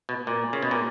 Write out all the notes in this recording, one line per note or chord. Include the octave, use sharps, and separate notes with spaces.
B2
A#2
C#3
B2
A#2